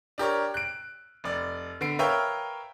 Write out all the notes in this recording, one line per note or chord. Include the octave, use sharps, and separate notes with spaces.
D4 G4 A#4 C#5
F#6 D7
F1 D5
D3 B3 C7 D7
A#4 B4 C#5 E5 F5 G5